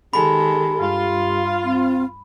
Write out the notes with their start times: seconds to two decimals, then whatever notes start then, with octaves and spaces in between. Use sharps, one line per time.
0.13 D#3 G#3 G4 A4 B5
0.81 G2 F4
1.65 C4